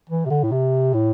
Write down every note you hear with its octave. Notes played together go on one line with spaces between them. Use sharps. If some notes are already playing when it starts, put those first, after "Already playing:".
E3
C3
D3
A2
C3
A2